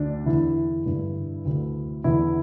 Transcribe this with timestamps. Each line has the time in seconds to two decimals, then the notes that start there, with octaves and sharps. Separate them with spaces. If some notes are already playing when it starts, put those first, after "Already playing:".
Already playing: D2 D4
0.26 E2 D3 E4
0.86 G2 D3
1.45 D2 D3
2.04 E2 D3 E4